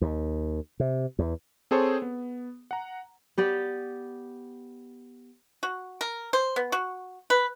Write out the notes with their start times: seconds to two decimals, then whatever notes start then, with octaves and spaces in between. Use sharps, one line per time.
0.01 D#2
0.80 C3
1.19 E2
1.71 C4 G#4 A4 C5 C#5
2.02 B3
2.71 F#5 A#5
3.38 B3 G4 D5
5.63 F#4
6.01 A#4
6.33 C5
6.56 B3
6.72 F#4
7.30 B4